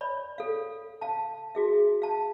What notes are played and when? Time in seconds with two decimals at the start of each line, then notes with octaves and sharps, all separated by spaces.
0.01 C#5 D5 B5
0.38 A4 F5
1.01 F5 A5
1.55 F#4 G#4 E5
2.02 F5 A5